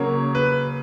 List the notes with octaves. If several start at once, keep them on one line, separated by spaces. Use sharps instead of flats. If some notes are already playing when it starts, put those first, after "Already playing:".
Already playing: C#3 F#3 A#3 C#5
B4